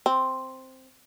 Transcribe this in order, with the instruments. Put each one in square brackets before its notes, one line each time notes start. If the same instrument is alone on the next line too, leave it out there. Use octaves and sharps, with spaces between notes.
[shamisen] C4